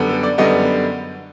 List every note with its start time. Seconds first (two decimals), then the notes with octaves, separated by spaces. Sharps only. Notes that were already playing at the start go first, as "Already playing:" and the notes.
Already playing: F#2 D3 G3 B3
0.09 A4
0.23 D5
0.38 F#2 D3 G3 B3 D#5